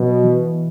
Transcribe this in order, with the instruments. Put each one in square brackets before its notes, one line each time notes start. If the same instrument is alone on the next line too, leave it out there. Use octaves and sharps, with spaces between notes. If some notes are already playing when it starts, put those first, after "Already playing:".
Already playing: [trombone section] B2 [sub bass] F#3
[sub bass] E3